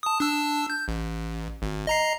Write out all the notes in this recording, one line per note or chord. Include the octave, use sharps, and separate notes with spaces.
A5 D#6
D4 A5 E6
G6
A1
G#1
D#5 A#5 C7